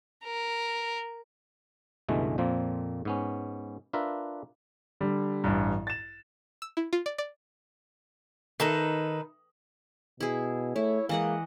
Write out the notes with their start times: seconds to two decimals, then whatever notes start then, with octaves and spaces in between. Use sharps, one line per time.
0.24 A#4
2.09 C#2 G2 B2 E3 G#3 A3
2.38 F2 A#2 F3 A#3 C4
3.05 G#2 B3 C#4
3.93 D4 F4 A#4 B4 E5
5.01 D3 G3
5.44 A1 G2
5.87 A6 E7
6.62 E6
6.77 E4
6.93 F4
7.06 D5
7.18 D5
8.60 D#3 D#4 A4 B4
10.20 B2 E4 G#4
10.76 A3 E4 C#5
11.09 E3 G#3 A#3 D#5 F#5